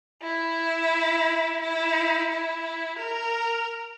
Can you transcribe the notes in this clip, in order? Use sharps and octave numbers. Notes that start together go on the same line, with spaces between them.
E4
E4
E4
A#4